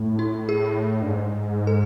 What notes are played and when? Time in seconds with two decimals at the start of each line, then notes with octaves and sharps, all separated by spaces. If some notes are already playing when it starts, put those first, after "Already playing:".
Already playing: A2
0.19 E4
0.49 G#4
1.02 G2
1.07 G#2
1.67 A4